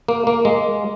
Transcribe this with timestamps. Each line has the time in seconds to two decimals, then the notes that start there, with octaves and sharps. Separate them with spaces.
0.08 A#3
0.27 A#3
0.45 G#3